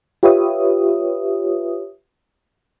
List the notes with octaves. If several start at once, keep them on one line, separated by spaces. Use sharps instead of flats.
F4 G4 B4 C#5 E5 D#6